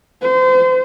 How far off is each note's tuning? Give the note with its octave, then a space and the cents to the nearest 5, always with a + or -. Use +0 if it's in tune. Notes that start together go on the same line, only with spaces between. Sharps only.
C5 -35